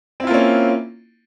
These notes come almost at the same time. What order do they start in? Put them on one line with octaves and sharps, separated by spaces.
C4 E4 F4 A#3 C#4